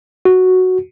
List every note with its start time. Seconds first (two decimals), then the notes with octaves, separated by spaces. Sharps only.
0.25 F#4